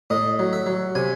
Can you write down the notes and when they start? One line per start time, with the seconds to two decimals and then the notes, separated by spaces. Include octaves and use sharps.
0.10 A2 D#5
0.39 F#3
0.53 E5
0.66 F#3
0.95 C3 G#5